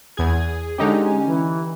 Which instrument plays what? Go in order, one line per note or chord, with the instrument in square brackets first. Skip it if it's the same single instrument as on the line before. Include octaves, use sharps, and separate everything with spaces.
[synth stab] E2 G#6 [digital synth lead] G#4
[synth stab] D3 D#4 G4 [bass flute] G#3 [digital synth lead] C#4
[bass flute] E3